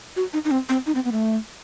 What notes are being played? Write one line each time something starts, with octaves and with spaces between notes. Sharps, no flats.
F#4
D#4
D#4
C4
C4
D#4
C4
B3
A3